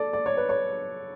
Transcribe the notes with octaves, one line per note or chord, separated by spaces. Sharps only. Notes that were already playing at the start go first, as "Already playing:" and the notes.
Already playing: A4 D5
D5
C#5
B4
C#5